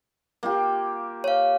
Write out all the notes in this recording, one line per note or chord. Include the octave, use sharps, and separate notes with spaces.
A#3 F4 G4
C#5 F5